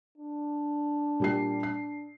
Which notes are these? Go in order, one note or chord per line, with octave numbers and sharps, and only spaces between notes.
D4
A#2 G3 C7
C7